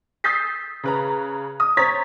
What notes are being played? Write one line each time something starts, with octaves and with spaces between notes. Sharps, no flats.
D#6 E6 G6 A6 B6 C7
C#3 B4 A#5
D#6
C5 C#5 A#5 G#6 A6 B6